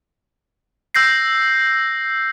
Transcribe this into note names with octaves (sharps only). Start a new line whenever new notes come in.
E6 G6 A#6 C7